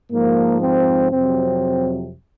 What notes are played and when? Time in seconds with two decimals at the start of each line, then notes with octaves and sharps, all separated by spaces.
0.11 G#2 F3 A#3
0.61 C4
1.11 F2 C3 F#3 C4